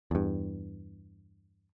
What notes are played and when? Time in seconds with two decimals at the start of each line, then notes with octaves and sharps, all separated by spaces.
0.11 E2 G2